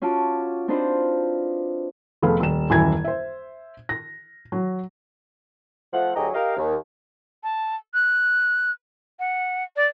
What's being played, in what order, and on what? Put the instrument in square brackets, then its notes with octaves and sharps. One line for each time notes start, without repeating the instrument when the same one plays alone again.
[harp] C#4 F4 F#4 A5 D6
C4 D4 D#4 F4 B4 C5
[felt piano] F1 A3 B3 G#4 F5 B5
D#1 E7
D#1 F#2 E3 E4 G#5 G#6
C5 E5
A#6
F#3
[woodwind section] F3 A3 F#5
D2 F#3 G4 G#4 D#5 A#5
G4 A#4 D#5 F5
D#2
[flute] A5
F#6
F#5
D5